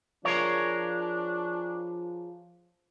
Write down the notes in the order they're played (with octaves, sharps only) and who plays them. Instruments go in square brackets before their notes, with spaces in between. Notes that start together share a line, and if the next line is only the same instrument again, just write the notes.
[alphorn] F3 [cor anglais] D4 [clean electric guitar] G#4 A#4 C#5